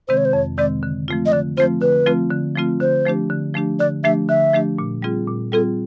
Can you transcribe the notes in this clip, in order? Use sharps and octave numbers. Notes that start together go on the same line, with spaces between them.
C3 D#3 G#3 C4 C5
C#5
C5
F2 C#5
C3 D#3 G#3 C4 D5
D3
F3 A3 C4 F4
D#5
D3 D5
F3 A3 C4 F4 C5
D3 B4
F3 A3 C4 F4
D3
F3 A3 C4 F4
D3 C5
F3 A3 D4 G4
D3
F3 A3 D4 G4
D3 D5
F3 A3 D4 G4 E5
D3 E5
F3 A3 D4 G4
A#2
G3 C4 F4 G#4
A#2
G3 C4 F4 G#4 A4